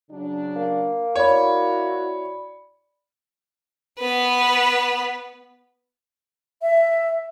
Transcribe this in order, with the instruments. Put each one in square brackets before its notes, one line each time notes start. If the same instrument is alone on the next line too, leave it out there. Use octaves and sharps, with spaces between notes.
[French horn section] C#3 F#3 D4
[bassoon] A#3
[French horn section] E4 F#4 [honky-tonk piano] C#5 [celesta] D5 B5
[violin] B3 B4
[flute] E5